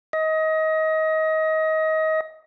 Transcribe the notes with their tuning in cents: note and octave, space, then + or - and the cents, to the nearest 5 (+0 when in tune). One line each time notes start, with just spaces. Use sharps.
D#5 +25